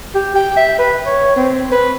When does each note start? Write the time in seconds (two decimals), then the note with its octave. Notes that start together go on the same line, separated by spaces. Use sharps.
0.15 G4
0.35 G5
0.56 E5
0.79 B4
1.06 C#5
1.36 C4
1.72 B4